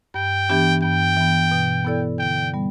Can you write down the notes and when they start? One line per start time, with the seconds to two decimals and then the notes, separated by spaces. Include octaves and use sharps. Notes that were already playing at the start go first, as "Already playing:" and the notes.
0.14 G2 G5
0.50 E3 B3 D4 G4
0.83 G2 G5
1.17 E3 B3
1.51 B2
1.84 B3 E4 A4 D5
2.19 D3 G5
2.54 G3 B3